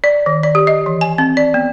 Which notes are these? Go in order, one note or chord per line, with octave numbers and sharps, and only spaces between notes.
D5
D#3
D5
G4
D#5
E3
G#5
C4
D5
B3